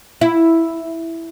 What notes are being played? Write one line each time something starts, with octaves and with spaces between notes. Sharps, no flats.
E4